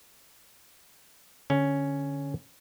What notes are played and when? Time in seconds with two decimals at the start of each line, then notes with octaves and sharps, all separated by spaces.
1.50 D3 C#4